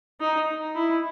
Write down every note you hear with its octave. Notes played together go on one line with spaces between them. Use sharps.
D#4
E4